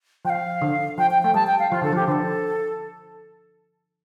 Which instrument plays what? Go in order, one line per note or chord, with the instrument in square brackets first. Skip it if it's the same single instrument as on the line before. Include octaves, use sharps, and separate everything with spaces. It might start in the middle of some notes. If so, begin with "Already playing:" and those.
[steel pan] F3 [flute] G5
[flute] F5
[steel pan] D3
[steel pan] F3 [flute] G5
[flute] G5
[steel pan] A3 [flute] G5
[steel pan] G3 [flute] A5
[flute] G5
F5
[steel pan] F3 [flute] F4
[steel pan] D3 [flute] A4
[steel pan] F3 [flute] G4
[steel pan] D3 [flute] A4 C5